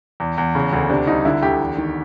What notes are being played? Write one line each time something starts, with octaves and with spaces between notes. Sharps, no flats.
E2
E2
C#3
D2
C3 D4
C2 D#4
D3 E4
D2 G4
E2
D#3